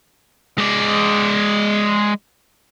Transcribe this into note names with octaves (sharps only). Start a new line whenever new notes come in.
G#3 D5